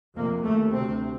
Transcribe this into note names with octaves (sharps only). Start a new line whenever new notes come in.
F2 C3 A#3
D#2 A3
D2 C3 C4